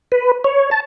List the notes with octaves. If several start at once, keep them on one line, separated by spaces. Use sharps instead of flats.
B4
C#5
A5